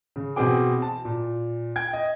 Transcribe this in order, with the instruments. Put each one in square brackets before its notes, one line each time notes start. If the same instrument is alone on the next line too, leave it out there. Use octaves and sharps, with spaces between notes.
[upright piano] C#3
B2 E3 C4 G#4 G5 D6
A5
A#2
G5 G#6
D#5